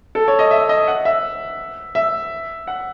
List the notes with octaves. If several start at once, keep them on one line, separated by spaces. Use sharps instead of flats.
A4
C#5
D#5
E5
D#5
F#5
E5
E5
F#5